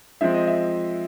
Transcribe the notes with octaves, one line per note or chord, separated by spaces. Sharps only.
F3 G#3 C4 E5
D#5
E5